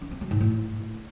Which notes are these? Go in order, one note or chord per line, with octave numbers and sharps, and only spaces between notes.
C#4
C4
F#3
G#2
A2